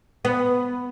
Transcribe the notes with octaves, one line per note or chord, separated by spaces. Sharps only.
B3